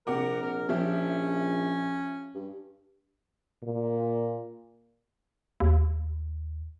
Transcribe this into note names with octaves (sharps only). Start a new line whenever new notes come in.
A#1 C3 A#4 F#5 D6
A#4
F3 C#4 G4 E5
G2
A#2
D#2